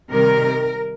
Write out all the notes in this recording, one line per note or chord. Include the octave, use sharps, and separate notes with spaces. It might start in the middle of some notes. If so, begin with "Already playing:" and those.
C3 D#3 G3 A#4